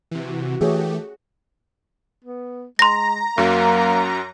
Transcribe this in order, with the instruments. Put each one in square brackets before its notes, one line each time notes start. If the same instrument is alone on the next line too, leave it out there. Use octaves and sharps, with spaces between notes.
[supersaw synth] C3 E3 [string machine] F#4
[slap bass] E3 [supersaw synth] A3 G4 [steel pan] G#4 C#5
[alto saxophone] B3
[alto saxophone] G#3 [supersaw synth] A#5 [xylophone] C6 A#6
[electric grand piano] F#2 F#3 [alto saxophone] A#3